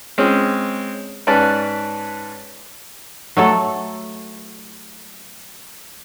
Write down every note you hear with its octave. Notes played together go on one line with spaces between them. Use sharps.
G#3 C4 C#4
G#2 C#4 B4 D5 A5 F#6
F#3 A3 A4